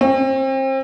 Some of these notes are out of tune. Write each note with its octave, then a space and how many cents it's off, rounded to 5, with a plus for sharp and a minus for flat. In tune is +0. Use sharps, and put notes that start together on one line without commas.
C4 +35